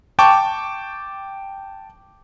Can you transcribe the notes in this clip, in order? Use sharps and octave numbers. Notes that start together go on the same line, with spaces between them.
G5 A5 C#6 D6